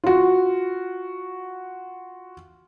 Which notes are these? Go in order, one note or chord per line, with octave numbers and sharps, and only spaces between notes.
F4 F#4